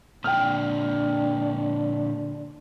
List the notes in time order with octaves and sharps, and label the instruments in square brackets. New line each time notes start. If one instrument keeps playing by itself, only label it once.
[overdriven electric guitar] A#2 D3 [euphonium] D4 [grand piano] G5 F6